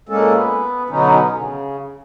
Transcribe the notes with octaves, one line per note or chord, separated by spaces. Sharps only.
A#2 G#3 A#3 C#4 A4
B3
B2 D3 F#3 B3 C#4 D#4
C#3